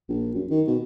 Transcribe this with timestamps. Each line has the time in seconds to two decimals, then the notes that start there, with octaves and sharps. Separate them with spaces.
0.09 A#1
0.34 F#2
0.50 D#3
0.67 B2